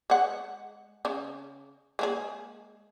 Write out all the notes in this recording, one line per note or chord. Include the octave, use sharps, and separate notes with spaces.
G#3 F#5
C#3
G#3 A#3 G#4